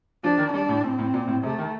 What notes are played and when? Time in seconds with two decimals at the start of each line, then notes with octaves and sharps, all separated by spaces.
0.24 F3 D4
0.38 D#3
0.53 G3 D4
0.69 A2
0.83 A2 C4
0.99 A2
1.14 A#2
1.28 A2
1.43 C3 A3
1.58 D#3